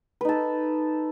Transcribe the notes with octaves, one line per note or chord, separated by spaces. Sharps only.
D#4 A4 B4